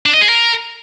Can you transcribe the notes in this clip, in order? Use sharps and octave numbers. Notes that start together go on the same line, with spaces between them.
D4
D#5
G#4
A#4